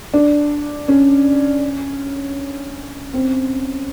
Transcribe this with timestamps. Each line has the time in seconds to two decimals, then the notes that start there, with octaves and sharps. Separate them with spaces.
0.14 D4
0.88 C#4
3.14 C4